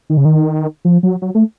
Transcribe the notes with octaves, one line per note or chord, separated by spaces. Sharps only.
D#3
C#3
D#3
F3
F#3
F#3
A3